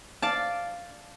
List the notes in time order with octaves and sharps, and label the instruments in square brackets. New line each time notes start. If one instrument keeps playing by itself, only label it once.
[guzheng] D5 F5 A5